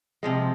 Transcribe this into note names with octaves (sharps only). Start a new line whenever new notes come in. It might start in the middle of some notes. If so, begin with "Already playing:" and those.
C3 F3 G#3